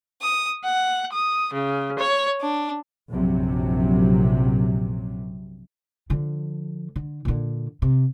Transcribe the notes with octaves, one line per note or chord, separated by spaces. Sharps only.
D#6
F#5
D#6
C#3
C#5
D4
A#1 F#2 C3 F#3
D3 F3
D3
A#2 D3
C3